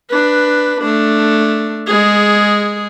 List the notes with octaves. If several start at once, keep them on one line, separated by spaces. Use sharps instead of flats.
D4 B4
A3 D4
G#3 G#4